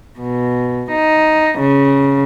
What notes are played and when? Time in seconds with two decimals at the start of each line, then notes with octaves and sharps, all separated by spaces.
0.20 B2
0.91 D#4
1.59 C#3